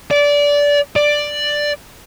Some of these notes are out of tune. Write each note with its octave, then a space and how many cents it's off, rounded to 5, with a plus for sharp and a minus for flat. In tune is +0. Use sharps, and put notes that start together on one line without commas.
D5 -20
D5 +5